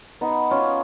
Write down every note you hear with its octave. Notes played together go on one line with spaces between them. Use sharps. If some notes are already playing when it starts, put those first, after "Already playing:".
B3 D#4
C#4 F4